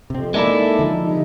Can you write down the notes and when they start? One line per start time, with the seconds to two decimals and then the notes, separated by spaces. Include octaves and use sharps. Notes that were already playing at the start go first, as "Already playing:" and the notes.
0.10 F2 C3 C4
0.34 G#3 A#3 D#4 E4 A4 D5 E5
0.79 D3 F3
1.03 C3 D#4